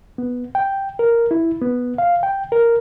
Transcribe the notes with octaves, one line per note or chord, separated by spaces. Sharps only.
B3
G5
A#4
E4
B3
F5
G5
A#4